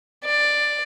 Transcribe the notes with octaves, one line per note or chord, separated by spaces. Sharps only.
D5